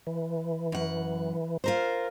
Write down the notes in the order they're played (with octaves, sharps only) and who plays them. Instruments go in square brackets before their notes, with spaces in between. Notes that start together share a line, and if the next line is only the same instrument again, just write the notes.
[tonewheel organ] E3
[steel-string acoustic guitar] F#2 F#5
F4 A#4 C5